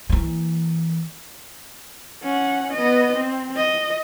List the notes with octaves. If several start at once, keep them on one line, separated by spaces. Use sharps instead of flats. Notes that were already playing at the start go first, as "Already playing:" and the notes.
E3 A#3
C#4 F#5
B3 D#5
C4
D#5